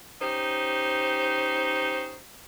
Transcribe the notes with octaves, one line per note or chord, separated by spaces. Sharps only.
C#4 D#4 G4 C5